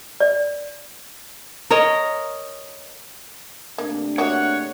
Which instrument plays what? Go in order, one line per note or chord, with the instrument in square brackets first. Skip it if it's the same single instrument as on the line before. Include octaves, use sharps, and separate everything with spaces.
[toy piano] D5
[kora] A#4 C#5 D#5
[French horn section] C3 A3 D4 [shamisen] A#3
[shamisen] A#3 F#4 E5 [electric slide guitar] C#5 [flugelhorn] F#5